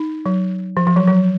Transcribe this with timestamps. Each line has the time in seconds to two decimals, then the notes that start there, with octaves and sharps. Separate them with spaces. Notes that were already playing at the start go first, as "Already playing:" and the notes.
Already playing: D#4
0.26 F#3
0.77 F3
0.87 F3
0.96 F#3
1.07 F#3